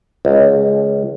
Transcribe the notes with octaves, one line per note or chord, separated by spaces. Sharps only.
C#2